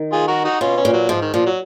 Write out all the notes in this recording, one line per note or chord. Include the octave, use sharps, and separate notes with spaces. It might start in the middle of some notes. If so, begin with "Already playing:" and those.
Already playing: D#3
F4 G#4
F#4 A#4
D#4 F#4
B2 C#4 F4
C#4
A#2
F#3
G#2 F3
D#3
A#2 F3
F#3